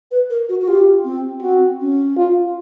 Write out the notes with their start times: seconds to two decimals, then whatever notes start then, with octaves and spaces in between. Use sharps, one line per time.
0.11 B4
0.30 A#4
0.49 F#4
0.61 F#4
0.68 F4 G4
1.05 C4
1.42 C4 F#4
1.80 C#4
2.17 F4